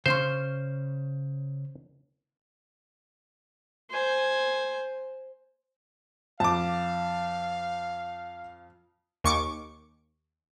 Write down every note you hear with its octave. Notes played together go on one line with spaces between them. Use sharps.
C#3 C#4 C5 C6
C5 G#5
F2 F5 A5 D6
D#2 C#6 D6